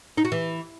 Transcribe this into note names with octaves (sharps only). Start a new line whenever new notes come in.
D#4
F#4
E3